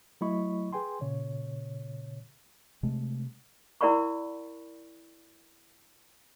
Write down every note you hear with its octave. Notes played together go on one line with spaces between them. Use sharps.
F#3 A3 E4 D#5 B5 C#6
G#4 B4 G5 G#5 C6
A#2 C#3 C#5
C3 G#3 A3
E4 A#4 D5 F#5 B5 C#6